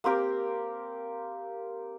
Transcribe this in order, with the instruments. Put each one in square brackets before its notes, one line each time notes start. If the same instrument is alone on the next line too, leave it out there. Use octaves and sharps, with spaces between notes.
[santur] A#3 C4 G4 A#4